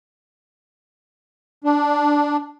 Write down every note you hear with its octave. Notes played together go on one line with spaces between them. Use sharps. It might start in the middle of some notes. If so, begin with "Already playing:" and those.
D4